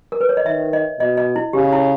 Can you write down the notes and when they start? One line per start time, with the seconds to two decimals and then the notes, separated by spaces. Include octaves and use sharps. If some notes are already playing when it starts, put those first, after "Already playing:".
0.12 A#4
0.21 B4
0.29 C#5
0.37 D#5
0.46 D#3 E5
0.73 D#5
1.00 B2 D#5
1.17 D#5
1.36 E4
1.53 C#3 G4
1.73 E4